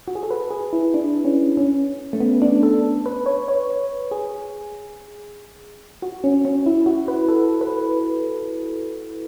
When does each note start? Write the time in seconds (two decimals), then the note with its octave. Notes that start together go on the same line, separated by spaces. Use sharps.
0.08 F#4
0.15 G#4
0.23 A4
0.31 B4
0.51 G#4
0.73 E4
0.94 D4
1.25 C#4
1.57 C#4
2.13 A3
2.20 B3
2.42 D4
2.63 A4
3.06 B4
3.26 C#5
3.48 C#5
4.11 G#4
6.02 F#4
6.24 C#4
6.45 C#4
6.66 E4
6.86 F#4
7.08 B4
7.29 A4
7.61 B4